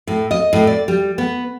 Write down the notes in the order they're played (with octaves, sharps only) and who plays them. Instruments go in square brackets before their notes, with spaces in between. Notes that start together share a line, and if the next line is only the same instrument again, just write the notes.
[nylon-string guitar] A2
D#5
A2
D5
G3
B3